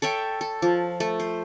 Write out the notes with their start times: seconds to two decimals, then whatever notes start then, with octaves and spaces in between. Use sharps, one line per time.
0.02 A4 C#5 E5 G5
0.41 A4
0.62 F3
1.00 A3
1.20 C5